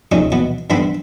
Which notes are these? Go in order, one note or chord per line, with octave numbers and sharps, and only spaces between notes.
F2 C3 A3 C#4 D#4
B2 E3 B3
G2 E3 B3 C4 A4 B5